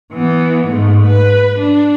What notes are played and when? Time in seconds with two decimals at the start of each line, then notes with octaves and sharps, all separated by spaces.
0.13 E3 B3
0.67 G#2 A3
1.06 B4
1.59 D4